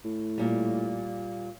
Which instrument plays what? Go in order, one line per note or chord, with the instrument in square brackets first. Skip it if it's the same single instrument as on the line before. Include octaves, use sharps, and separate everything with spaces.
[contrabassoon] A2
[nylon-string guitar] A#2 G3